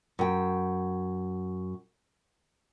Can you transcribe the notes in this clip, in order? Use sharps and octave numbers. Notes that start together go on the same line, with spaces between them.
F#2 G5